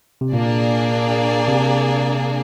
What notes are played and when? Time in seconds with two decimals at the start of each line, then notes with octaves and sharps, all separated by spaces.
0.21 C3
0.32 A#2 A#3 D4 G#4 D5
1.48 C3